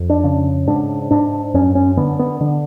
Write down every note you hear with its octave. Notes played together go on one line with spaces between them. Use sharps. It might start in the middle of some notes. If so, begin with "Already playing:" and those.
Already playing: F2
D4
C#3
G#2 D4
G#2 D4
F#2 C#4
C#4
D3 B3
B3
D3